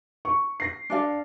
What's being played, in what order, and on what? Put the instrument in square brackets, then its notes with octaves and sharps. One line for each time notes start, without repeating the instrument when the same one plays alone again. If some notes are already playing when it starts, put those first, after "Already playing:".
[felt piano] C#6
A#6 C7
[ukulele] D4 A4 F5